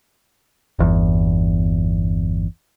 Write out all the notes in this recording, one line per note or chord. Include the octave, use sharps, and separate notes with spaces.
G1 E2